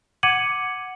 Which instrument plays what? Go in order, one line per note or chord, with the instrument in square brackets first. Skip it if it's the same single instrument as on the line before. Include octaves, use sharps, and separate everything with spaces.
[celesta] F#5 D6 G#6 C#7 D#7 F#7